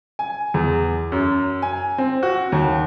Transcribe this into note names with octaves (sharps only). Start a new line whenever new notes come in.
G#5
E2
F#2
G#5
C4
F#4
D#2